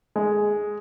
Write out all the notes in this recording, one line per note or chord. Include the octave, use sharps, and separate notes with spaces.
G#3